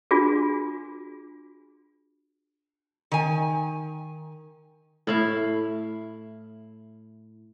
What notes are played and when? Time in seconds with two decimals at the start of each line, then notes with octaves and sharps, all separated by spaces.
0.11 D4 F4 F#4 G#4
3.12 D#3 G#5
5.07 A2 E4 F5